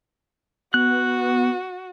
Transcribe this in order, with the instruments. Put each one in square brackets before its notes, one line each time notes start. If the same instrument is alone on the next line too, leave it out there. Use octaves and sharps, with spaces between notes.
[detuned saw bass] B3 [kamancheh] F#4 [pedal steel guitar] F#6